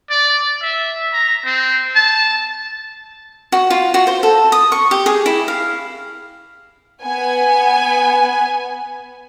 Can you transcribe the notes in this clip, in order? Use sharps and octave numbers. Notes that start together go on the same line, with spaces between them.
D5
E5
A#5
C4
A5
F#4
F4
F#4
C5
A4
D#6
C#6
G4
G#4
E4
F5
B3 G#5